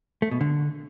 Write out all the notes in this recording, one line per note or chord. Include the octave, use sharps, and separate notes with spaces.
A3
B2
D3